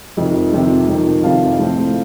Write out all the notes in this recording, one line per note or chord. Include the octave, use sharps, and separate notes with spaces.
F2 C3 D#3
F2 C3 D#3
F2 C3 D#3
F2 C3 D#3 F5 A5
A#1 A2 A3 C4